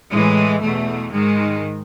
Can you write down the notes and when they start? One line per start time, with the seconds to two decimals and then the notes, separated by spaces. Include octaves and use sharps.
0.12 A2 E3 G#3
0.62 E2 B2 A3
1.12 G#2 D#3 G#3